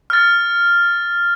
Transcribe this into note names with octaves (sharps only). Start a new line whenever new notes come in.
F6 A6